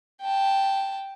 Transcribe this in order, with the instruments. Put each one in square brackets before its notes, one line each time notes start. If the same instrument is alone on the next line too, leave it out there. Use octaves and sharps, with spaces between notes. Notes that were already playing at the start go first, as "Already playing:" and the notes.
[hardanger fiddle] G5 A5